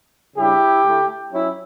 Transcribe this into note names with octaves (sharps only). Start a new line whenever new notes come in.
C#3 G3 D4 E4 G4
D3 A3 E4
F#3 C#4 E4